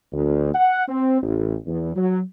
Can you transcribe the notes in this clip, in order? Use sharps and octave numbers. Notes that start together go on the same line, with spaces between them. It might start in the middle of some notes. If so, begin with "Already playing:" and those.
D2
F#5
C4
A1
E2
F#3